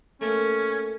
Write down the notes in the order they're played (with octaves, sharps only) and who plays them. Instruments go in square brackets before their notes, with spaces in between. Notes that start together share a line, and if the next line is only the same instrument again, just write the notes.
[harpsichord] A3 A#3 [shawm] C#4